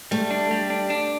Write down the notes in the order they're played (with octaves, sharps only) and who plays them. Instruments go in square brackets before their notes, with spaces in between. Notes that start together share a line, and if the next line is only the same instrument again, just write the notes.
[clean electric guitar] G3 [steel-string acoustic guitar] A3
[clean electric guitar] D4
G3
D4
D4